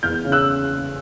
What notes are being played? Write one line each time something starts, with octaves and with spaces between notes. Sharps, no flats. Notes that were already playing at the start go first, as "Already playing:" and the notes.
E2 F6 G6
C#3
E6 F#6